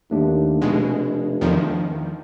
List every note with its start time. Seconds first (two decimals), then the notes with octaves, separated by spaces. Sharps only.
0.11 D#2 A3 D4
0.62 F1 B2 G#3
1.41 E2 D#3 F3